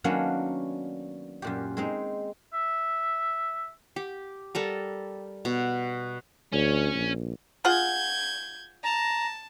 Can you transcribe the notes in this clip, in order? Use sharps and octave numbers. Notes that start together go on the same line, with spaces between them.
D#3 F#3 A#3 B3 C#4 D4
F#2 A#2 G4
G#3 C4 D#4
E5
G4
G3 A4 A#4
B2
D2 C#4
A#1
F4 G#4 F#5 G6 G#6
A5 A#5